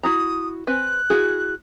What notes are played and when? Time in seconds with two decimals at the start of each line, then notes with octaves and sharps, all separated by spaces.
0.03 E4 F#4 A#5 D#6
0.67 C4 B4 G#5 F#6
1.10 E4 F#4 G#4